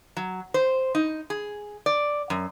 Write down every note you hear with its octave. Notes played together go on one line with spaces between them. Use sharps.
F#3
C5
D#4
G#4
D5
F#2